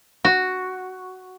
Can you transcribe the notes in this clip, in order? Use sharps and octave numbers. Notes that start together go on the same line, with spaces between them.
F#4